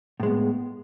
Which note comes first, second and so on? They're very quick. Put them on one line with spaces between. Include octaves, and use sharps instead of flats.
A2 G#3 B3